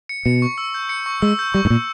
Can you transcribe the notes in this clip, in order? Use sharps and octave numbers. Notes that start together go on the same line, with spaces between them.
C#7
B2 C#7
C#6
E6
G6
C#7
C#6
G#3 E6
G6
G3 C#6
G#2
A#2 C#6